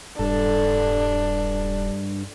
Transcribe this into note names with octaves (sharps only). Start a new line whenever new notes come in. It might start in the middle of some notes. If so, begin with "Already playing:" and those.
D#1 G2 D4 A4